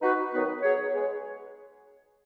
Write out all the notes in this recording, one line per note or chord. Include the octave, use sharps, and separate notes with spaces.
B3 D#4 F#4 B4
D#3 F#3 B3 D#4 B4
F#3 B3 G#4 C#5
G#3 B3 G#4 C#5